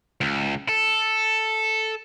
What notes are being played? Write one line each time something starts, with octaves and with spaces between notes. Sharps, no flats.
C#2
A4